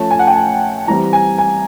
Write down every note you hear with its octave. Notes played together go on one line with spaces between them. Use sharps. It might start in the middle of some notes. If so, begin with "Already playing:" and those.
Already playing: F3 A3 C#4 A5
G#5
F#5
G5
G#5
E3 G3 C4 A#5
G#5
G#5